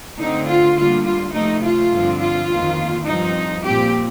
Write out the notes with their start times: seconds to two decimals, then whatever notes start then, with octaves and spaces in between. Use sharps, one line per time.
0.18 D3 A3 C4 D#4
0.47 F4
0.76 D3 G3 A#3 F4
1.04 F4
1.33 C3 F3 A3 D#4
1.62 F4
1.91 G2 D3 F3 C4
2.19 F4
2.48 F2 D#3 A#3
3.05 G2 F3 C4 D#4
3.63 A#2 F3 C4 G4